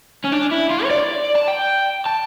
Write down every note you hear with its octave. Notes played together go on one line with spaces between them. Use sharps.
C#4
D4
E4
F4
C#5
D5
A5
G5
A5